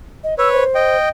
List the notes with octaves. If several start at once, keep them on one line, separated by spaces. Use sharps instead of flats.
D#5
B4 C#5 E6
C5
D#5 G5